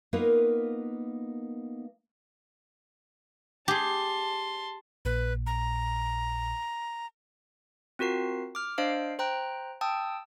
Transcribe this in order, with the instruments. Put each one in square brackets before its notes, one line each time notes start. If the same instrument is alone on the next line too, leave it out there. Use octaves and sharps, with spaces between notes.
[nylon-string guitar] A#3 B3 D#4 F4 A#4 B4
[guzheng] G4 G#4 [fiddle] A5 C6
[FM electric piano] A#1 A#2 [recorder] B4
[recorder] A#5
[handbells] C4 F4 F#4 A#4 C7
D6 F6
D4 C5 D#5 F5 C7 D7
C5 G5 A#5 F#6
G5 A5 D#6 E6